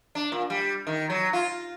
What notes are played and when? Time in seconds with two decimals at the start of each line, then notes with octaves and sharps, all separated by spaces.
0.15 D4
0.32 A#2
0.50 G3
0.87 D#3
1.10 F#3
1.33 F4